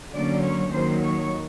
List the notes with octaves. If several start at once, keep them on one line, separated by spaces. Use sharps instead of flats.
D3 F#3 A#3 C#4 D5
C#5
D#2 D#3 F#3 C5
C#5